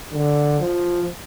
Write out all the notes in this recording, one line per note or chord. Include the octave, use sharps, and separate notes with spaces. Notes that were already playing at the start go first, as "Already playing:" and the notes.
D3
F3